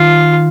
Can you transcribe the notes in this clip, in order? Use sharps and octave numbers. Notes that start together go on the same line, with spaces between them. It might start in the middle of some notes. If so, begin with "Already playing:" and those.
Already playing: D#3 F4